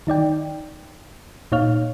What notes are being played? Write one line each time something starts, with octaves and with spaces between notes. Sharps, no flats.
D#3 D#4 D5 G5
A#2 D#4 C#5 F5 F6